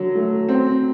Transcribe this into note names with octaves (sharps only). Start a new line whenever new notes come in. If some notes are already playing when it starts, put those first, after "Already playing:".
Already playing: D3 F#3
A3
C4